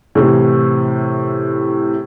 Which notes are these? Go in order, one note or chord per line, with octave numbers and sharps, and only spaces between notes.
A2 C3 E3